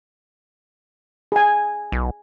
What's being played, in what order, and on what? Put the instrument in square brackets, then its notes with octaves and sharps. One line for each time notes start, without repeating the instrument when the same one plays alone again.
[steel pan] G#4 G#5
[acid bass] B1